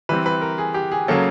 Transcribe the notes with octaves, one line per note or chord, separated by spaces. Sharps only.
E3 G3 C4 B4
B4
A#4
G#4
G4
G#4
C#3 F#3 A#3 C#4 A4